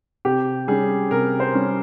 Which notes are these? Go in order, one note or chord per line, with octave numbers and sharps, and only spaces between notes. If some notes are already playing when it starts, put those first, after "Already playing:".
C3 G4
G3 C#4 G#4
C3 A#4
C5
G3 C#4